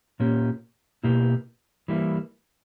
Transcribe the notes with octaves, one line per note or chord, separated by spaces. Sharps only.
A#2 A#3 C#4 G4
B2 A#3 E4 G4
E3 G3 A#3 E4